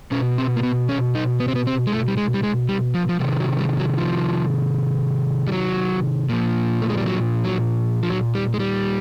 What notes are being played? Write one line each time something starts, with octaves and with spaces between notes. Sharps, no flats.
B2 C#4
C4
A#3
B3
C#4
D#4
B3
C4
B3
C4
G#3
A3
G3
G#3
G3
G#3
G3
F3
F3
C3 D#3 F#3
F#3
G3
F#3
F3
G3
F#3
A#2 F3
A3
G#3
G3
F#3
F#3
F3
F#3
G3
G#3
G3